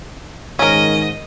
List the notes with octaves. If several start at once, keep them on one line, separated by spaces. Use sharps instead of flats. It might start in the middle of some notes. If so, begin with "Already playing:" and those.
G#2 D#3 C#4 A#4 D#5